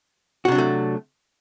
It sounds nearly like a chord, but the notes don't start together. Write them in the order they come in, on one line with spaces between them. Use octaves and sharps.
F#4 C3 D4 F#3 A3